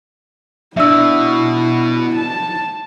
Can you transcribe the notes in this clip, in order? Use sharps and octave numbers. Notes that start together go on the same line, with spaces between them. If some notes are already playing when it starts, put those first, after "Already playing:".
B2 D4 E4 E5 E6
A5